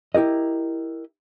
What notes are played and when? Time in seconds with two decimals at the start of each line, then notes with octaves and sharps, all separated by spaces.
0.15 E4 G4 A#4 D#5